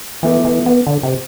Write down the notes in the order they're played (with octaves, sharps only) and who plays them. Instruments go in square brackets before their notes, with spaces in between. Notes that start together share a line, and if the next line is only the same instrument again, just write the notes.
[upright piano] E2 B2 A3 E4 [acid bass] E3
[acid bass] E3
B3
D3
C3